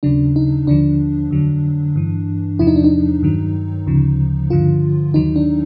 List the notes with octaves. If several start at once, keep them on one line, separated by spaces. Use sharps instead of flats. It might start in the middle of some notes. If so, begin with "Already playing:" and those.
D#2 C#3 F#3 D4
D#4
D#2 D3 F3 D4
F2 D3 F#3
G2 E3
E2 C3 F3 E4
D#4
D4
D#4
G2 D#3 F#3
D2 C#3 F3
G2 D3 F3 F4
D#2 D#3 F#3 D#4
D4